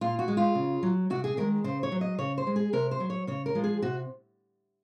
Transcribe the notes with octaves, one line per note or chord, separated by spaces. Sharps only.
A#2 F4
F#4
G#3
F4
C#3
F#3
C3 F#4
G#4
D#3 G#3 A#4
C#3 C5
C#5
F#3
D#5
C#3 C#5
C5
G#3
G#4
C3 A#4
C5
F#3
C#5
C#3 C#5
A#4
F3 G#3
G#4
C3 F#4